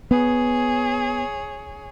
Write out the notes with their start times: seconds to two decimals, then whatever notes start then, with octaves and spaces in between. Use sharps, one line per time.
0.11 B3 G#4 C#5